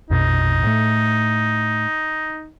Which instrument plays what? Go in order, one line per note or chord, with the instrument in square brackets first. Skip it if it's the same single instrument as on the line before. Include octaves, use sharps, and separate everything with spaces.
[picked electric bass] A#1 F2 B2 [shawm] D#4
[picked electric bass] A2 A3